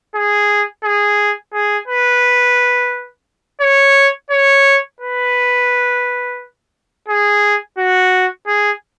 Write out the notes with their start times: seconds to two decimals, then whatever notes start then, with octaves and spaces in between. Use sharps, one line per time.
0.15 G#4
0.84 G#4
1.54 G#4
1.88 B4
3.61 C#5
4.30 C#5
5.00 B4
7.08 G#4
7.78 F#4
8.47 G#4